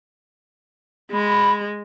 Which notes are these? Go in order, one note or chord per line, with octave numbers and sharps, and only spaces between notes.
G#3 B5